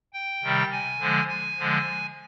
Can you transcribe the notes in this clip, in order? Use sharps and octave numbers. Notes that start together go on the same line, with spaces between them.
G5
C3 D#3 G3
G#5
D3 F3 G#3
G#5
D3 F3 G#3